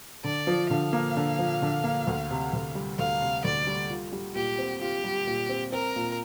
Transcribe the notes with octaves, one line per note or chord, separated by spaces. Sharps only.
D3 D5
F3
D3 F5
A#3
D3
F3
D3
A#3
D2
C3
D2
G3
D2 F5
C3
D2 D5
G3
F4
G3
A#2 G4
C4
F4 G4
G3
A#2
C4
C4 A#4
A#2